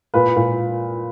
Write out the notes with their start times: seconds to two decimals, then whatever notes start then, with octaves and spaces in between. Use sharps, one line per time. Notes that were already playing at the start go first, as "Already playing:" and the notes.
0.14 A#2 B4
0.36 A#2